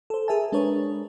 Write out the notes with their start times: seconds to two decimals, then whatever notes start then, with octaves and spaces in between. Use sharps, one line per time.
0.10 A4 C5
0.28 G#4 A#4 E5 G#5 A5
0.52 G#3 D4 A#4 B4 C#5